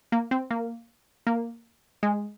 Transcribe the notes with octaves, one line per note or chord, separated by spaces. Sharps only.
A#3
C4
A#3
A#3
G#3